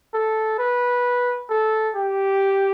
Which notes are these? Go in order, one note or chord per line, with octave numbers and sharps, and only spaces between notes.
A4
B4
A4
G4